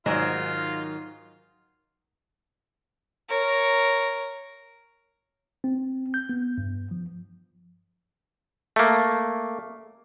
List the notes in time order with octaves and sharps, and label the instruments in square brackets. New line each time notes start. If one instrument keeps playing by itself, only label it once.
[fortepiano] G#2 [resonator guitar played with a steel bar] D#3 F#3 D#5 [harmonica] F4
[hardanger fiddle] A#4 C#5
[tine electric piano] C4
G6
B3
G2
F3
[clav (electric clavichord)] A3 A#3